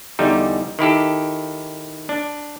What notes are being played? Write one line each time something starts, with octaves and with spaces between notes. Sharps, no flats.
E2 D3 G3 D#4
D#3 E4 G4 A4
D4